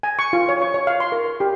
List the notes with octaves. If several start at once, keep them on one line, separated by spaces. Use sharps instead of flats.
G#5
C#6
F4
C#5
C#6
C#5
F5
C6
A#4
G4